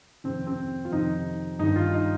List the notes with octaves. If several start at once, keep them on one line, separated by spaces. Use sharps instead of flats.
F2 C3 D#3 C4
C4
F4
F2 C3 D#3 D#4
G2 D#3 D#4
F4
D#4